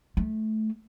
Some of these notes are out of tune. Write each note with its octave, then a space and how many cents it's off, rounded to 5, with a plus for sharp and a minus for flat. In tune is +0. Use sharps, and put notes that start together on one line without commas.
A3 -15